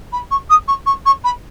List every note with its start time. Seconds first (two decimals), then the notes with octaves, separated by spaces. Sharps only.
0.12 B5
0.31 C#6
0.50 D#6
0.68 C#6
0.86 C#6
1.05 C#6
1.24 B5